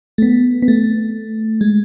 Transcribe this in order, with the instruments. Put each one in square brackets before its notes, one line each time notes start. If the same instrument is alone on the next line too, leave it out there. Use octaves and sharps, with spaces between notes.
[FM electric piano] A3
B3
B3
A3
G#3